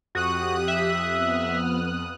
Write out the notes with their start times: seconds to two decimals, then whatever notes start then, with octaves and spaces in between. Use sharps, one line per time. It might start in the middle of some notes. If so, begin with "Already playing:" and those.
0.15 F2 F#4 G4 D#6 F#6
0.68 E5
1.13 B3 F6